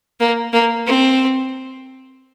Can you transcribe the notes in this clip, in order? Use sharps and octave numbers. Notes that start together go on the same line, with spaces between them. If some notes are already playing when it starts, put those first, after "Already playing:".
A#3
A#3
C4